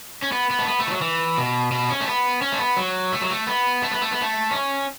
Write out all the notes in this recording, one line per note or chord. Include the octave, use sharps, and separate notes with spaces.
C#4
B3
B3
A3
B3
A3
E3
F#3
E3
B2
B2
C#4
A3
B3
C#4
A3
B3
F#3
A3
F#3
A3
B3
A3
B3
A3
B3
A3
C#4